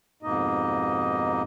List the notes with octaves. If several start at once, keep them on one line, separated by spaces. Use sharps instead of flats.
F2 G#2 B2 A#3 D#4 D#5